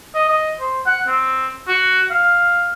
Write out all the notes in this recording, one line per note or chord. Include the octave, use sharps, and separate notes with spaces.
D#5
D#5
C5
F#5
C4
F#4
F5